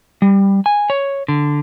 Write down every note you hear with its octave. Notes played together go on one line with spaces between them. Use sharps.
G3
G#5
C#5
D3